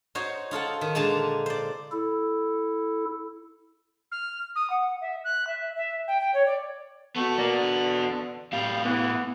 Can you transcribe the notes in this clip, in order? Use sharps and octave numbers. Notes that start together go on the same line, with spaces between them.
D#4 F#4 C5 C#5
D#4 F4 A4 F#5
D#3
A#2 D3 G#3 D#4 A5
C5 D5
E4 A4
F6
D#6
F#5
E5
F#6
E5
E5
G5
G5
C#5
D5
A3 B3 F#4
E2 A#3 D5
D3
A2 G3 F4 F5
E3 B3